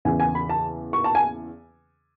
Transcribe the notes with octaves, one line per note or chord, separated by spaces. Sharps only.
E2 C#3 E3 G#5
G#5
B5
A5
C#6
A5
G#5